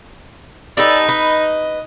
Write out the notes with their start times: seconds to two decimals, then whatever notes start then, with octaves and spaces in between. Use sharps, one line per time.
0.77 D#4 G4 A4 B4 D5
1.09 B4 D#5